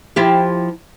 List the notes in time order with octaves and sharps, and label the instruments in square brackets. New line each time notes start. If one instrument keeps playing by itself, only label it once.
[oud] F3 E4 G4